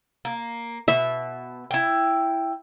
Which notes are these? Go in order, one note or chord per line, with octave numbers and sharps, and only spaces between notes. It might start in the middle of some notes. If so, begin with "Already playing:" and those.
A#3
B2 E5
E4 G5